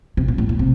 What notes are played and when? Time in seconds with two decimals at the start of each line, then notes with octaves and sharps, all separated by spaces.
0.17 C3
0.28 A#2
0.38 A2
0.49 A#2
0.59 C3